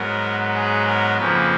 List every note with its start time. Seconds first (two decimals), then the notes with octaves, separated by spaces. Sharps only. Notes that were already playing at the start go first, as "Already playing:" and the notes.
Already playing: G#2 F#3 B3 A#4
0.54 G#4
0.86 A#4
1.18 F2 C#3 F3 A#3 B4